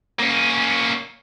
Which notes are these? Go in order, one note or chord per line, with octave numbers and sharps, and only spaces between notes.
A#3 C#4